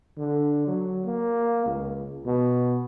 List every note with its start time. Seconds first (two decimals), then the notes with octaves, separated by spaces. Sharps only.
0.18 D3
0.67 F#3
1.06 A#3
1.66 C#2
2.26 B2